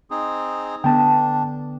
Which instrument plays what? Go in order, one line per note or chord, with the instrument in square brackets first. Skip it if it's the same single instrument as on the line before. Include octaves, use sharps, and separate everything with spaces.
[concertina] C4 D#4 G#4
[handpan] D3 B3 [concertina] D4 [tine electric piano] G5 A5